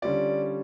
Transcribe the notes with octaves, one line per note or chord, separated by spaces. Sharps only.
D3 G3 C#4 F4 D5